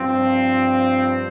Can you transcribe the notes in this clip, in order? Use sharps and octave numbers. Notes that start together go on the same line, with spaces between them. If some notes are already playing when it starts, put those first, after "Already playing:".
Already playing: G2 F3 C4